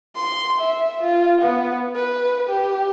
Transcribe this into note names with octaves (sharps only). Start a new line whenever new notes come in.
C6
E5
F4
B3
B4
G4